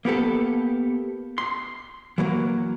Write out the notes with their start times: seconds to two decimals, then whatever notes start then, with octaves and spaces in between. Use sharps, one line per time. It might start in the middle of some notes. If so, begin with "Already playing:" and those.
0.05 A#3 B3 G4 A4
1.38 C6
2.18 E3 F#3 A#3